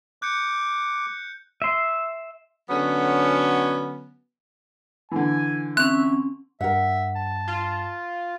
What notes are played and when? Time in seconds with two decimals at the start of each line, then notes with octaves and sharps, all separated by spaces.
0.22 D6 F#6 G6 C#7
1.62 E5 C6
2.70 D3 F#3 B3 C#4
5.11 D3 E3 G#5
5.77 C4 C#4 E5 F#6
6.61 G2 A#4 E5 F#5
7.16 A5
7.47 F4